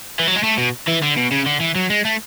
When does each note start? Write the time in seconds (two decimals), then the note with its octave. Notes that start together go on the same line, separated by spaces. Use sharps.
0.19 E3
0.27 F#3
0.36 G#3
0.43 A3
0.58 B2
0.87 E3
1.02 D3
1.16 B2
1.31 C#3
1.46 D3
1.60 E3
1.75 F#3
1.90 G#3
2.05 A3